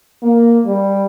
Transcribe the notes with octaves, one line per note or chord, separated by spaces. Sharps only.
A#3
G3